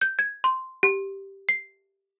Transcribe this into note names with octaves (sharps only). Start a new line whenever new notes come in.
G6
G#6
C6
G4
C7